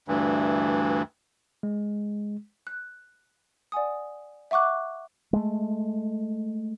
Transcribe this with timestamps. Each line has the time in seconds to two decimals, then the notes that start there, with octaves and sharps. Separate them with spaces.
0.08 D2 G2 E3
1.63 G#3
2.67 F#6
3.72 D5 F#5 G#5 D#6
4.51 E5 F#5 C#6 D6 F#6
5.33 G#3 A3